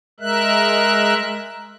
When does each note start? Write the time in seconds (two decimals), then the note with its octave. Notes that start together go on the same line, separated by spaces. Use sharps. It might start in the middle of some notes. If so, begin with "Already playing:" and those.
0.20 G#3 A#4 E5 F#6